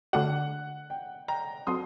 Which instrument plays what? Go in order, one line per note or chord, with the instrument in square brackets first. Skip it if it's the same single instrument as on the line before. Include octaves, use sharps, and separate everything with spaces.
[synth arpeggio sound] D3 A3 D4 F#4 [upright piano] F#5
[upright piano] G5
G5 A#5
[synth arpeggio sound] F#3 C4 F#4 A4 [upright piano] C6 D#6